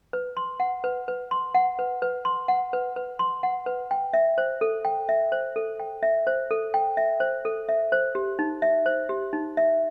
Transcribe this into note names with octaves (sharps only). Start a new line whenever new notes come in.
B4
C6
F#5
B4
B4
C6
F#5
B4
B4
C6
F#5
B4
B4
C6
F#5
B4
G5
E5
C5
A4
G5
E5
C5
A4
G5
E5
C5
A4
G5
E5
C5
A4
E5
C5
G4
D#4
E5
C5
G4
D#4
E5